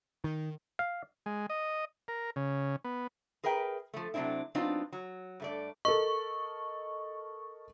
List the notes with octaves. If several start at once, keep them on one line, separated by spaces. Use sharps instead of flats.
D#3
F5
G#3
D#5
A#4
C#3
B3
G#4 A#4 B4 E5 G5
F3 A3
C3 F#3 A3 C4 D4 E4
F#3 B3 C4 D4 D#4 F4
F#3
G2 A3 D5
A4 A#4 D#5 C#6